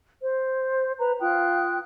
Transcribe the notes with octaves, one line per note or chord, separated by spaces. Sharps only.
C5
B4 A#5
F4 G5 D#6 F#6